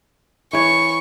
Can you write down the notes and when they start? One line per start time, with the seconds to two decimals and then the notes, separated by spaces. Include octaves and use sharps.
0.53 E3 C#5 C#6